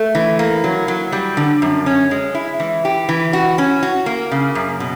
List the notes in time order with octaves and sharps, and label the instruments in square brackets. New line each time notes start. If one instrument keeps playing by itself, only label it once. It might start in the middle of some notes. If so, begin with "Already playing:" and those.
Already playing: [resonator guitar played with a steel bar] A3
E3
A#3
F#3
F#3
G3
D3
F#2
C#4
G#3
E4
E3
G4
E3
F#4
C#4
F#4
A#3
C#3
F#2
B2